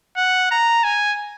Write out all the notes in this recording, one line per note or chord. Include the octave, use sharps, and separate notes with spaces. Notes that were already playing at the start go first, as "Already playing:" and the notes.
F#5
A#5
G#5